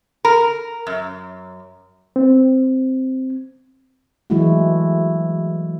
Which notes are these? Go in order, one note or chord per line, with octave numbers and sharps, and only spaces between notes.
A#4
F#2
C4
E3 F#3 G#3 A3 E4 F#4